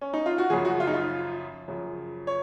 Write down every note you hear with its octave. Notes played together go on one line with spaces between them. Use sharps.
C#4
D#4
F4
F#4
F#2 C#3 F3 G#4
F#4
F4
D#4
F4
F#2 C#3 F3
C#5